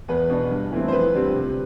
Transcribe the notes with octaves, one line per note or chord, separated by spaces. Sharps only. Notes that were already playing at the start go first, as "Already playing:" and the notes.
E2 B4
B2 B3 D4
G2
E3 A3 C4
C5
F2 B4
D3 G3 C4
C3